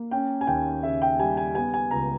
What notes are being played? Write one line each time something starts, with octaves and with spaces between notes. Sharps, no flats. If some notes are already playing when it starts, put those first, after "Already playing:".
Already playing: A#3
C#4 G5
G#5
D#2 G5
C#3 E5
G5
G3 G#5
G#5
B3 G#5
G#5
C#2 A#5